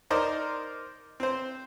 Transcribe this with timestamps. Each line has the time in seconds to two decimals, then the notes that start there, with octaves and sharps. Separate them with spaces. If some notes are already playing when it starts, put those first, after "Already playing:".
0.10 D#4 A#4 C5 D5 D#5
1.20 C4 C5